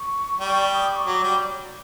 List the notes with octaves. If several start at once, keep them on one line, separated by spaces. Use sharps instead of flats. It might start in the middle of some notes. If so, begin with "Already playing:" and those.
Already playing: C#6
G3
D#6
D6
C#6
F#3 D6
G3